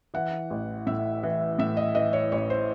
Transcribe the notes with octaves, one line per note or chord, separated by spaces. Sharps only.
E3 F#5
A1
A2 E5
E3
A2 E5
D#5
E3 D#5
C#5
A1 C#5
C5